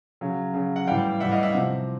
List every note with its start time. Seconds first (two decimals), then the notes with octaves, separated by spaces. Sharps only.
0.21 C#3 F#3
0.54 C#3 F#3
0.76 F#5
0.87 A2 E3 G3 F5 G5
1.20 A2 E3 G3 E5 F#5
1.31 D#5 F5
1.43 E5 F#5
1.54 C3 F3